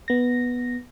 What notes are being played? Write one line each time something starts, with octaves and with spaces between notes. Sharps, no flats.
B3 A#6